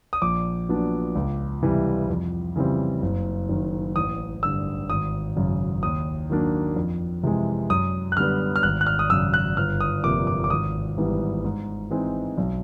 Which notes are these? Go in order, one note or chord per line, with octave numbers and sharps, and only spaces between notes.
D#6
A#1 D6
A#2 F#3 B3 D4
C#2
C3 E3 G3
F2
C#3 E3 G3 C4
F#1
F#2 D#3
A1 D#6
G2 D3 E6
G#1 D#6
F#2 C#3
D#2 D#6
D#3 F#3 A#3 D4
F2
C3 E3 G#3
F#2 D#6
F#6
D3 G3 B3 F6
F6
G#1 F#6
F#6
F6
D#6
F#2 C#3 E6
F#6
G1 F6
D#6
F2 C3 F3 A#3 D6
D6
D6
G#1 D#6
G#2 E3 G3 B3
G#2
E3 G#3 C4 D#4
B1